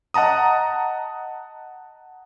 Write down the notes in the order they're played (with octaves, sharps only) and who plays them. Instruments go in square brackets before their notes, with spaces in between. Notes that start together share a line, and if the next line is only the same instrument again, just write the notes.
[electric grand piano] D#5 F#5 A5 A#5 D#6